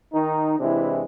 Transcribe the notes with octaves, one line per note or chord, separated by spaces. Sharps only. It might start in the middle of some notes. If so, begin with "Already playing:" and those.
D#3 D#4
C3 E3 G#3 D4 E4